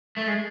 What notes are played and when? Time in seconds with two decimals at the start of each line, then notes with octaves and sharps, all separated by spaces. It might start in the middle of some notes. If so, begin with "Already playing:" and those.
0.17 A3
0.27 G#3